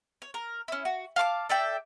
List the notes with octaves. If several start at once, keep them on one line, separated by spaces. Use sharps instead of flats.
C#5
A#4
C#4 E4
F#4
F5 A5 C#6 D6
A4 D5 E5 G5